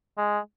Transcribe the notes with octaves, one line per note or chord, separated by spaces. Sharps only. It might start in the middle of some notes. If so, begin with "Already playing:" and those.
G#3